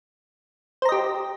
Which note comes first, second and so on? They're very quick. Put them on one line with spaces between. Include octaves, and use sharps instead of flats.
C5 A#5 D#5 G4